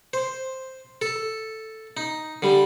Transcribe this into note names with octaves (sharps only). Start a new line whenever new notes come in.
C5
A4
D#4
D3 G3